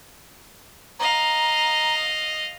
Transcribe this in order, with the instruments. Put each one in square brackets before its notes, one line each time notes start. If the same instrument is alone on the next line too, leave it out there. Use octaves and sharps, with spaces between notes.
[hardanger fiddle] D#5 F5 [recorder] A#5